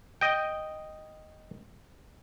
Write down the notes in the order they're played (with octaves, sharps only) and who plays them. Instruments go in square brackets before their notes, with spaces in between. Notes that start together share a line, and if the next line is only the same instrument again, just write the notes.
[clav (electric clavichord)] D#5 G5